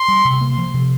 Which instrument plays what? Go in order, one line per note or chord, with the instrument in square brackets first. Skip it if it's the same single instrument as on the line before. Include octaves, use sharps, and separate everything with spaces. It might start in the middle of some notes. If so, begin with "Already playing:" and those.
Already playing: [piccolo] C6
[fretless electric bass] G3
C3
A#3
F3
C3